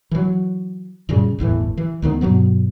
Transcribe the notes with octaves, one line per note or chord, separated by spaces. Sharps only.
E3 F#3
F#2 A#2 C#3 G3
G1 E2 A2 E3
E3
D2 D#3 G3 B3
G2 B2 F#3 B3